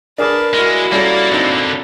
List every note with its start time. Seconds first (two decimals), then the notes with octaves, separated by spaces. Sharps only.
0.18 D4 G#4 A#4 B4 D5 A5
0.54 G#3 E4 F#4
0.92 G3 A#3 C#4 A4 D5
1.33 D3 A#3 C4 D4 D#4